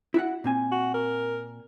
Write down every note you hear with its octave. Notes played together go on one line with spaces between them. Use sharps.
E4 F#4 F#5
A#2 C4 G#5
F#4
A#4